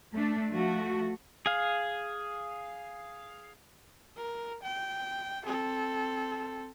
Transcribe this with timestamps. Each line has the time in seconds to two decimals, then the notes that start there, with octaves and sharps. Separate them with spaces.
0.15 A3 D4
0.55 F3 A3 F#4
1.46 G#4 F5
4.17 A#4
4.63 G5
5.45 C4 A4